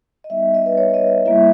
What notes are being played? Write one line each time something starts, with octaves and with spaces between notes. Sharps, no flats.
D#5
G3 B3 D#4 E5
D#5
B4
C#5
D#5
G3 A#3 E4 E5